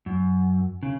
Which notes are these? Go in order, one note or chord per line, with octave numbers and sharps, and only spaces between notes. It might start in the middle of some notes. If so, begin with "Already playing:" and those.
F#2
C#3